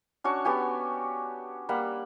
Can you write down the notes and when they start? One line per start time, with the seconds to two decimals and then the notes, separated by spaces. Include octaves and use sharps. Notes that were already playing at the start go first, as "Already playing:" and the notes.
0.24 C#4 D4 F#4 C#6
0.45 B3 F#4 G4 G#5
1.69 G3 A#3 F#5 B5